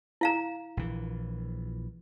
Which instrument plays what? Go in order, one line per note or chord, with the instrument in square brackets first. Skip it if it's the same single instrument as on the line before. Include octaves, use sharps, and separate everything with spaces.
[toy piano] E4 F5 A#5
[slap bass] A#1 E3